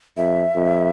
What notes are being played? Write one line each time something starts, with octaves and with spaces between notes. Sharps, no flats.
F2 E5
F2